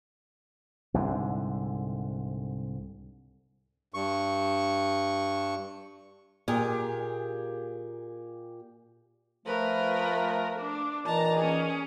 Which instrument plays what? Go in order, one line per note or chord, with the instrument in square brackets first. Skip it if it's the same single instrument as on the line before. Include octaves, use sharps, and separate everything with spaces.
[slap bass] C2 G#2 D3
[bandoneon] G2 C#6
[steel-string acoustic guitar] A#2 G4 G#4
[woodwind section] F3 A3 [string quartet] A#4 B4
[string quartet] D4
[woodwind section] A#2 D#3 E3 [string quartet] A5 A#5
[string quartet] C#4 G#4